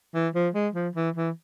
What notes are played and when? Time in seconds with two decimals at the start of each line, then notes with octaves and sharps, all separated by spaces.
0.14 E3
0.34 F3
0.54 G#3
0.74 F3
0.95 E3
1.16 E3